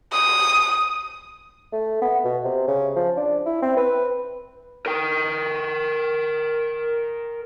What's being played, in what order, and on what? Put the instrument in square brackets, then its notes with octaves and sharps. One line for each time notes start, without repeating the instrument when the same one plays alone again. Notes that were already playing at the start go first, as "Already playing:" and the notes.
[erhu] D#6
[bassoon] A3
B3
B2
C3
C#3
F3
D4
E4
C4
B4
[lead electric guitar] A#4 G5